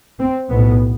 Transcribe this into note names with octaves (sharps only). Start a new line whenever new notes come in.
C4
B1 A2 B3